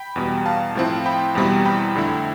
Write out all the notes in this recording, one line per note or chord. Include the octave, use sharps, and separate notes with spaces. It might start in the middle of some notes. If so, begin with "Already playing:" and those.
Already playing: G5 B5
E2 B2 G3
F5 A5
A2 F3 C4 E4
G5 B5
E2 B2 G3 C4 E4
G5 B5
F2 D3 A3 E4